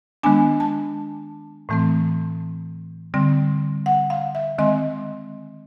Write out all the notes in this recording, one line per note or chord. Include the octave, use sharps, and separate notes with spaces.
D#3 G#3 B3 D4 G#5
A5
A2 E3 A3 C4
D3 G3 C4
F#5
F5
E5
D#3 G#3 C4 D#5